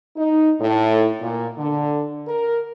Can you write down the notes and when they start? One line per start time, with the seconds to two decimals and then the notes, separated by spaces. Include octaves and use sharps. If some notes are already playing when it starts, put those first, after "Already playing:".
0.16 D#4
0.60 A2
1.20 A#2
1.58 D3
2.28 A#4